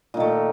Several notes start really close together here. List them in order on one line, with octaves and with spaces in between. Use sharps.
A#2 D#3 A3